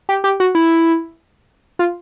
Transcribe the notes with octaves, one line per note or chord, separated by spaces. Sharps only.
G4
G4
F#4
E4
F4